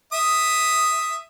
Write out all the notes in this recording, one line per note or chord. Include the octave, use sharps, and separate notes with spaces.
E5 D#6